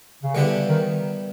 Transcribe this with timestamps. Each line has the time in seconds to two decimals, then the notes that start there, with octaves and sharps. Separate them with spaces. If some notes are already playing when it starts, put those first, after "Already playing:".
0.23 C#3
0.35 D3 G3 B3 E4 G4
0.68 D#3